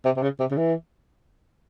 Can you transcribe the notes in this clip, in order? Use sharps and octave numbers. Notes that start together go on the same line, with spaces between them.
C3
C3
C#3
C3
C#3
E3